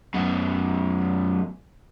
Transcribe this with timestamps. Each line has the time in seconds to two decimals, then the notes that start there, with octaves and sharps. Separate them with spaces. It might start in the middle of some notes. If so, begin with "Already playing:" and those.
0.14 F#2 B2